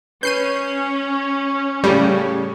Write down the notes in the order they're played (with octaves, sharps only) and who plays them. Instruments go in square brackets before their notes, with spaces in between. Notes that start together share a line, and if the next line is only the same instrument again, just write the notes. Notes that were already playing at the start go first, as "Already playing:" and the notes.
[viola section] C#4 [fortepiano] B4 [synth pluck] G6 C7 D#7
[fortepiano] A2 C#3 [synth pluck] G3